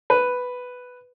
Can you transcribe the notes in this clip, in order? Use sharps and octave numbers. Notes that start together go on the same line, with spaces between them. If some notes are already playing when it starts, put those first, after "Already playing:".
B4